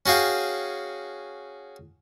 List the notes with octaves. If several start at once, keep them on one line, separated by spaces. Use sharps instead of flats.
C#4 F#4 G#4 F5 G5